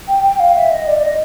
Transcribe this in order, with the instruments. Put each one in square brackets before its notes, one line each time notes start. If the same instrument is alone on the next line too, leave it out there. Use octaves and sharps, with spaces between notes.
[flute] G5
G5
F5
E5
D#5
D5
D5
D#5